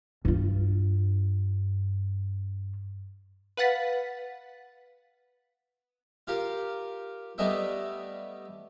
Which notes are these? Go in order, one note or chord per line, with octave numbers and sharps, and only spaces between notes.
G2 F4
B4 F5 F#5 A6 B6
F4 G4 A#4
G3 A3 B3 D#5 E5 G5